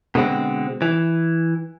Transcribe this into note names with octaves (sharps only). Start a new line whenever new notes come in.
B2 D3 G#3 C4
E3